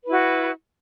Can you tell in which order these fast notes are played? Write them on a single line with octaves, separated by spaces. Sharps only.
B4 E4 F#4